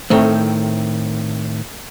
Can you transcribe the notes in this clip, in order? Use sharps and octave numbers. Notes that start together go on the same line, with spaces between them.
A2 D#3 A3 C4